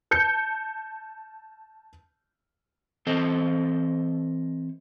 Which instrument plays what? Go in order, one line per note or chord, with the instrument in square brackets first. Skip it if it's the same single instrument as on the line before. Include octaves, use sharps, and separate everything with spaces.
[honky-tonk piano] A5 G6 C#7
[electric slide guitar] E3 C4 A4 C5 D#5